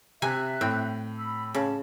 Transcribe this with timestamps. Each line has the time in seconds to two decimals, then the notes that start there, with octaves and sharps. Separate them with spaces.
0.22 C3 E5 G#5 F#6
0.61 A2 C4
1.18 B5 E6
1.55 C#3 A5